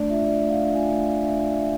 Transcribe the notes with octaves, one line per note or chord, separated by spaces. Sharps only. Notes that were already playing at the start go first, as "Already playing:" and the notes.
Already playing: A3 D4 D5
F4 E5
A3 D5
A3
F5
D4
F4 G#5
A3
F5
A3
D4 E5
F4 D5
A3 E5